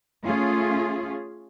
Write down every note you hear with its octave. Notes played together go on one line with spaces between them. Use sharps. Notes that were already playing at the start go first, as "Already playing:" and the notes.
A3 C#4 F4 G#4